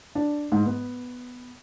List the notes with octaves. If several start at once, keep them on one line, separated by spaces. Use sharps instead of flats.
D4
G#2
B3